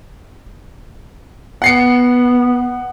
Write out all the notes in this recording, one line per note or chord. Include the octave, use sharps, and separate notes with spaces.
B3 F#5 C7 C#7